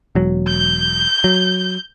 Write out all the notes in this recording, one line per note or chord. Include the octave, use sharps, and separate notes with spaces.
E1 F#3
G6
F#3